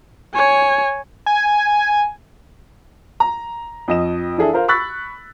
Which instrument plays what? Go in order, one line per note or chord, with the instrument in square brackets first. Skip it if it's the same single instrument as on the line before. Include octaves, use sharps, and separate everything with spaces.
[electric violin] C#5 G#5
[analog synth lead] G#5
[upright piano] A#5
F2 D#5 E7
E3 D4 G#4 A4 E5
F4 A#4 C5 F5
B5 C#6 E6 F#6 A6 B6